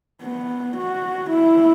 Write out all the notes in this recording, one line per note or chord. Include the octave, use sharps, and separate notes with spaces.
B3
F#4
E4